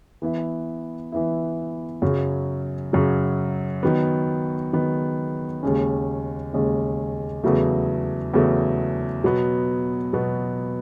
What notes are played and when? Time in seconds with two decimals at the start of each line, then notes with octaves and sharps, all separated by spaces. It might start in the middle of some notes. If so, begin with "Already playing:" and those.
0.22 E3 B3 E4
1.12 E3 B3 E4
2.02 F#2 C#3 F#3
2.93 F#2 C#3 F#3
3.83 D#3 F#3 B3
4.73 D#3 F#3 B3
5.63 D#2 C#3 G#3 C#4
6.53 D#2 C#3 G#3 C#4
7.44 E2 C#3 F#3 A3
8.34 E2 C#3 F#3 A3
9.24 B2 F#3 B3
10.13 B2 F#3 B3